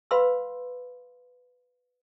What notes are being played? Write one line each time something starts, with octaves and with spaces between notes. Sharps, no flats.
B4 F5 B5 C6 E6